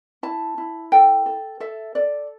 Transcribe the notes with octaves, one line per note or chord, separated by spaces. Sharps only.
E4 A5
E4
A4 G5
A4
A4 E5
A4 D5